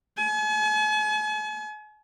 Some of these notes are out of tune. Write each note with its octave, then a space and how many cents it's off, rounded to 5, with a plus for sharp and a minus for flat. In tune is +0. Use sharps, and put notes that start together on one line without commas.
G#5 +45